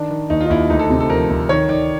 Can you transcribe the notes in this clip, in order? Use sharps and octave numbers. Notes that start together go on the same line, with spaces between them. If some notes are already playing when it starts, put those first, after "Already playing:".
Already playing: D#3 D4
D#3
D#2 D#4
F4
D#4
D#2 E4
D2 D#4
A4
C3
A4
F3 A#4
D2
D#3 C#5
D#3 D5